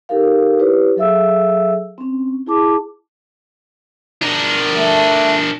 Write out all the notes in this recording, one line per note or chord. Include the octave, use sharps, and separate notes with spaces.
D#4 G4 A4 A#4 F5
E4 G4 B4 C#5
F#3 G#4 A4 E5 F5 E6
C4 C#4
E4 G#4 A5 D6
D4 A#4
A3